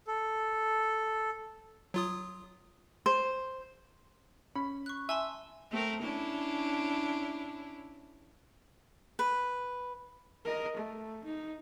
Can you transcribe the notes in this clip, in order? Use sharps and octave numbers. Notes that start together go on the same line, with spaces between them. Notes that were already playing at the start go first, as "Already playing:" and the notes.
A4
F#3 F4 D#6
C5
C#4 B5
C#6 F#6
E5 G#5 A5 C6
A3 C4 A#4
C#4 D4 E4
B4
A#4 D#5
A3
D#4